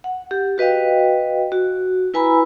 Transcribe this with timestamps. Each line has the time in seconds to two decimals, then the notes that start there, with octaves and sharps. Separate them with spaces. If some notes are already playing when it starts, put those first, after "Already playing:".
0.04 F#5
0.31 G4
0.58 F#4 B4 D#5 F5 G5
1.52 F#4
2.14 E4 B4 G#5 A#5 B5 E6